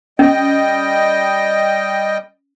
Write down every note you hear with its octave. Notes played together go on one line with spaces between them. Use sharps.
G3 C#4 D#5 G5